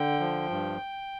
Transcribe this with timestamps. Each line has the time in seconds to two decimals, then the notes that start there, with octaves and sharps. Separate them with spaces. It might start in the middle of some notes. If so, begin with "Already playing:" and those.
Already playing: D3 G5
0.20 F3
0.50 G2